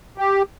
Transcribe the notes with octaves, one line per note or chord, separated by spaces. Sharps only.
G4